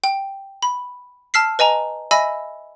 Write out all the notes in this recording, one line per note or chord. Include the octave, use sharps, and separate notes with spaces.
G5
B5
A5 E6 F6 B6 C7
B4 D#5 G#5 A#5
D#5 E5 G#5 B5 E6 A#6